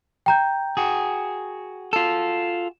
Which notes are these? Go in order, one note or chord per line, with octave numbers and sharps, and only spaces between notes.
G5 A#5 G6
F#4 G#4
F4 A4